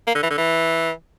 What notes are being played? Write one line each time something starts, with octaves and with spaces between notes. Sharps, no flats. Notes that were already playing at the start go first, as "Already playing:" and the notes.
A#3
D3
E3
D3
E3